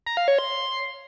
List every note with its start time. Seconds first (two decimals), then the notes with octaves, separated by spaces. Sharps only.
0.06 A#5
0.17 F5
0.28 C#5
0.39 C6